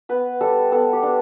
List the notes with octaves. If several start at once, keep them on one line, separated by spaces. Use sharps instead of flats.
B3 B4
G3 A4
B3 A4
G4
D4